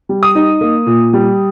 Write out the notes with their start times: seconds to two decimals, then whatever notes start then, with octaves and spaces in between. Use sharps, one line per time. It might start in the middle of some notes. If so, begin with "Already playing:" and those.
0.09 G3
0.23 D#6
0.35 D#4
0.61 A#3
0.86 A#2
1.13 G3